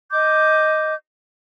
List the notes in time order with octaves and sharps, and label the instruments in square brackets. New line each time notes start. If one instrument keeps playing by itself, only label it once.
[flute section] D#5 D6 G6